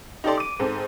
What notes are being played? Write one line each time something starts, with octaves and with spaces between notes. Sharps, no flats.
D#4 G4 A4 D5 C6
D6 D#7
G#2 C4 A4